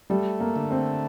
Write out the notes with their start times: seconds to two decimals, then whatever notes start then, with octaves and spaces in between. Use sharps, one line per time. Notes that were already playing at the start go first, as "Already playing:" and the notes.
0.10 G3 A3
0.40 A#3
0.56 D3
0.71 C4